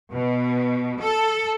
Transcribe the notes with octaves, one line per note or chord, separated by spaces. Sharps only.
B2
A4